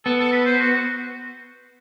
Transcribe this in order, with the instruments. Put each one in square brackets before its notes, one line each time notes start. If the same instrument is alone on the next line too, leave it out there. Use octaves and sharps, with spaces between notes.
[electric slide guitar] B3 [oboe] A4
[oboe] A4
B4
C5
F#4
F#4